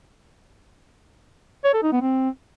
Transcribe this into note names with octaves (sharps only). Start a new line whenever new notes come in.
C#5
A4
D#4
B3
C4